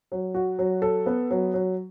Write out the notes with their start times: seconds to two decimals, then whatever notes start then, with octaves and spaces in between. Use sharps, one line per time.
0.12 F#3
0.34 F#4
0.59 F#3
0.82 A4
1.06 B3
1.31 F#3
1.54 F#3